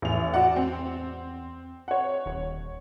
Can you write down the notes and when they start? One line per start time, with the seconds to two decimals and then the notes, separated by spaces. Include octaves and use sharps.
0.02 A1 E2 F7
0.34 F#4 D5 F#5
0.56 C4
1.88 C#5 F#5
2.26 D#1